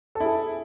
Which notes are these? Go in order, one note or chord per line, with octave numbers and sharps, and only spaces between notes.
E4 G#4 A4